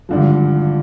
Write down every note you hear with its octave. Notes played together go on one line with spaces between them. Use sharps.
G#1 G2 D3 F3